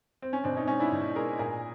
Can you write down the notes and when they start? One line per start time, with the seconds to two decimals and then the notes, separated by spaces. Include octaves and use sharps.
0.22 C4
0.33 C#4
0.44 B2 C4 D4
0.57 C#4 D#4
0.67 G#3 C#4 D#4
0.80 D4 E4
0.92 B2
1.15 G#3 G#4 A#4
1.39 A#2 G#4 A#4